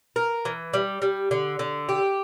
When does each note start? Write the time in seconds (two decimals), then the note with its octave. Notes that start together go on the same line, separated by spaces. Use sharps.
0.16 A#4
0.45 E3
0.74 G3
1.02 G3
1.31 D3
1.59 D3
1.89 G4